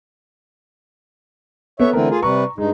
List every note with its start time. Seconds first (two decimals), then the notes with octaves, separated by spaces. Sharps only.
1.80 B3 A4 C#5 E5
1.93 D3 E3 A3 C4 A#4
2.10 F4 G#4
2.23 C3 G3 B4 A#5 C#6
2.58 G2 G#3 D#4